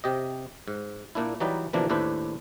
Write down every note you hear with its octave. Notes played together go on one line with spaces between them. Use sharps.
C3 G4 D#5
G#2
A#2 A#3 D4 E4
E3 F#3 G3 D#4 B4 D5
B2 D3 E3 F3 A#3 D4
D#2 A2 D4 E4 B4 C5